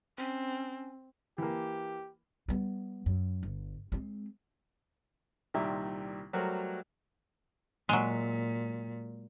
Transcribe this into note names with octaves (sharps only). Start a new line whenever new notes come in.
C4 C#4
E3 A#3 G4
G3 B3
F#2
G1
G#3 C4
C2 A#2 D#3 G3 G4 E5
F#3 G3 A3 F#4 A#4 C5
A#2 F#3 G#3